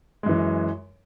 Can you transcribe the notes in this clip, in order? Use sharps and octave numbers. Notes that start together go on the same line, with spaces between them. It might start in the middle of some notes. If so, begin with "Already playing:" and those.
F#2 E3 G#3